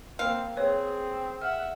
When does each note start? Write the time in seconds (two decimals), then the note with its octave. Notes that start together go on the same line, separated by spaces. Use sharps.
0.19 A#3 C4 F5
0.57 C4 G#4 B4 C#5
1.42 E5 F#5 F6